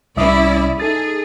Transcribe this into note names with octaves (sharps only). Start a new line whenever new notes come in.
C2 C#4 E4 D5 E5 D#6
D#4 G#4 A4 A6